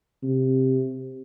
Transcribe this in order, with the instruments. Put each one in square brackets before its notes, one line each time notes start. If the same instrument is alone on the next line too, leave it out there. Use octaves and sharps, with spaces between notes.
[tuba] C3